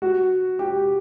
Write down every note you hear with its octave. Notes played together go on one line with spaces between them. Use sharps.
F#4
G4